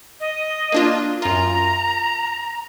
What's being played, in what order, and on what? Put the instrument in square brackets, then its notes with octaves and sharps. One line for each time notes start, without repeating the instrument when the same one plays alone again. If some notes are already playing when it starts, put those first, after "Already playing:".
[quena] D#5
[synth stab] A#3 D4 F4
[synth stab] F#2 F4 [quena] A#5